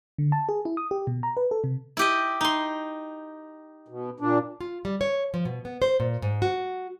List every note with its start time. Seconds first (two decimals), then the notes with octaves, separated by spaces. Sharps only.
0.18 D3
0.32 A5
0.49 G#4
0.65 E4
0.77 D#6
0.91 G4
1.07 B2
1.23 A#5
1.37 B4
1.51 A4
1.64 C3
1.97 E4 G4 D#5
2.41 D#4 C6
3.88 B2
4.20 A#2 D4
4.61 F4
4.85 G3
5.01 C#5
5.34 F3
5.45 B2
5.65 B3
5.82 C5
6.00 A#2
6.22 G#2
6.42 F#4